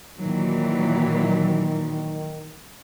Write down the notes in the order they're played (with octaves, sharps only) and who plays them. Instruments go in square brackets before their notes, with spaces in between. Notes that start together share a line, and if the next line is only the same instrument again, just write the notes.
[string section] A#2 E3 F#3 [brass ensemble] D#3